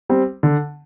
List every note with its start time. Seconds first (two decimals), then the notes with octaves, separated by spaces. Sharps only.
0.09 G3 C4
0.43 D3